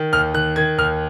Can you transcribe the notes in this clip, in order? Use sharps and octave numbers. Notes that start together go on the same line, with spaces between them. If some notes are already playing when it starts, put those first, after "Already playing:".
Already playing: D#3
D#2 F6
D#3 F#6
D#3 G#6
D#2 F6